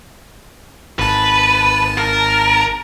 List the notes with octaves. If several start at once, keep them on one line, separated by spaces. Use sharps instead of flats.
G#1 B4 A5
A#4